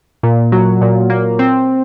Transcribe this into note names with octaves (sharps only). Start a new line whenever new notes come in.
A#2
F#3
A#2
A#3
C4